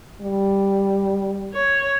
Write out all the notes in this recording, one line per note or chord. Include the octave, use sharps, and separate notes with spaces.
G3
C#5